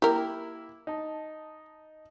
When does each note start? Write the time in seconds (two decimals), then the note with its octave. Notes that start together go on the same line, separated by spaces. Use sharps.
0.02 A#3 E4 G4 A#4
0.87 D#4 A5